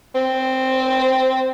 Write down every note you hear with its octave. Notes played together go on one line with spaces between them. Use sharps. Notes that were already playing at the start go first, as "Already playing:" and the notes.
C4